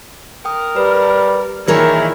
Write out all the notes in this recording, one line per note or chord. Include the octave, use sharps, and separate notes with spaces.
A#4 G5 D#6
G3 B4
A#2 D#3 E3 E4 G#4 A#4 C#5